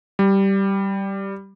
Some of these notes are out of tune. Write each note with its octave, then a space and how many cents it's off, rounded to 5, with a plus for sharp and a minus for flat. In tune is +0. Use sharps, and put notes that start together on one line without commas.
G3 -5